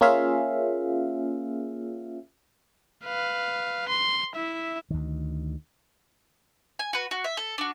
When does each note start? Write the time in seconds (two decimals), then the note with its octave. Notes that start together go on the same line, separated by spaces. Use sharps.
0.01 A#3 C#4 F4 G#4 E5 F5
3.04 B4 F5
3.89 C6
4.35 E4 E5
4.91 D2 D#3
6.79 G#5
6.93 F#4 B4
7.11 F#4
7.24 E5
7.37 A4
7.58 D4 F#4